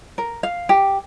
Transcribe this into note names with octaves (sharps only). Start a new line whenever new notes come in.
A#4
F5
G4